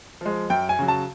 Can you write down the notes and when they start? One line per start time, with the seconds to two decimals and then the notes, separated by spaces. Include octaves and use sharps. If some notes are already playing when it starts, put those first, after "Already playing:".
0.21 F3 G#3
0.50 F#2 G5
0.69 G#5
0.79 C#3 F#3
0.88 A5